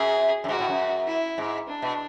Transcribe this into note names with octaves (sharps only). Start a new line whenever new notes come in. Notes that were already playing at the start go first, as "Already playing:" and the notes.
Already playing: F#2 G#4
F#2
G#2 F#4
A2
F#2
E4
G#2
D4
B2